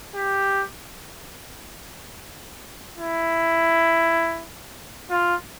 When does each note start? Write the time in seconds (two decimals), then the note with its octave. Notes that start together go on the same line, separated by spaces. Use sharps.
0.15 G4
2.98 E4
5.10 F4